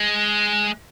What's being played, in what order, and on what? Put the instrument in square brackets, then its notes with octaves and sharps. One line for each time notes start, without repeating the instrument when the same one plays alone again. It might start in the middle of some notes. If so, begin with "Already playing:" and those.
Already playing: [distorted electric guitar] G#3